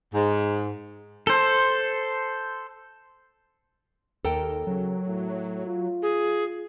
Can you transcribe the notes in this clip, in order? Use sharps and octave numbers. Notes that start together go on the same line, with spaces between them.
G#2
A4 C5
D#2 A4 A#4 G5
C#3 F#3
A2
F4
G#4